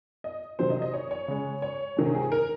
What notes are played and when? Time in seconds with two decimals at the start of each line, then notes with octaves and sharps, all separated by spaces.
0.24 D#5
0.59 C3 D#3 F#3 C5
0.70 D#5
0.82 D#5
0.93 C#5
1.11 C#5
1.28 C#3 G#3
1.62 C#5
1.97 C3 D#3 G#3
2.15 G#4
2.32 A#4